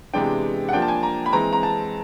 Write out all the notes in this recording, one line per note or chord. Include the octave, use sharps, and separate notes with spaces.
C3 E3 G#3 B3 D4 G5
F#5
F3 A#3 D4 G5
A5
G#5
A#5
B5
E3 G#3 C4 A#5
A#5
A5